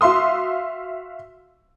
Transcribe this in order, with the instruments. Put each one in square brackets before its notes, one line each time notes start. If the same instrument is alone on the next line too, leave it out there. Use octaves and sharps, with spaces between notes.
[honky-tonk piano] F#4 E5 F5 C6 D#6